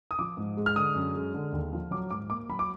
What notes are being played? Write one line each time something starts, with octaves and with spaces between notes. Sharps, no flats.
D#6
F3 D6
G#2
G#3
F6
D3 D#6
F#2
G#3
D3
D#2
F3
F#3 D6
G#2 D6
A#3 D6
F#3 B5
D6